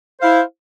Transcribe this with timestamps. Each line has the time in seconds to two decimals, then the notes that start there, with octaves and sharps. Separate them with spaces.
0.19 C5
0.22 F5
0.24 E4